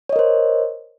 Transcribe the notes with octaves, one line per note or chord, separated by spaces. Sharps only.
A#4 C5 C#5 D#5